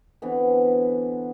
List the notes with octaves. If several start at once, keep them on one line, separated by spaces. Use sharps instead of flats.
D3 E3 B3 C4